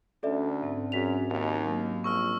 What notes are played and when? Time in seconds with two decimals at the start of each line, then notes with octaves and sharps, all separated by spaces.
0.23 D2 C#4 D4 A4 D5 E5
0.62 G#2 C4
0.92 F#2 C4 C#4 F#4 G#4 B6 F7
1.30 D#2
1.63 F#3 A#3 B3
2.04 A#1 C#6 E6 F6